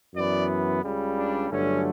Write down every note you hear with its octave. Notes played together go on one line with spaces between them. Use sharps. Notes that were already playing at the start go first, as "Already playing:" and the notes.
F#2 E3 B3 D5
C#2 C#3 G3
D4
G1 G2 D3 F#3 A3 C#4